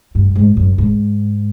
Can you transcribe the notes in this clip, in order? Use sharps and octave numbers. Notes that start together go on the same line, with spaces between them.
G2
G#2
F#2
G#2